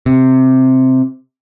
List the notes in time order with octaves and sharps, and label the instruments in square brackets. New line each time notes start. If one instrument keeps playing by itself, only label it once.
[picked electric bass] C3